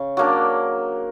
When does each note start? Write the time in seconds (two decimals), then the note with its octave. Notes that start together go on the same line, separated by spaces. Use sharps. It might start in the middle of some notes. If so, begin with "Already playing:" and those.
Already playing: C#3
0.17 F#3 A#3 D4